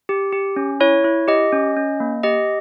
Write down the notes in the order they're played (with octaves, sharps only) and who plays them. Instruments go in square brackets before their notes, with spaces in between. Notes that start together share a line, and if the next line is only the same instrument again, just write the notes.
[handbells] G4
G4
C#4
E4 C#5
E4
G4 D#5
C#4
C#4
A#3
G4 D#5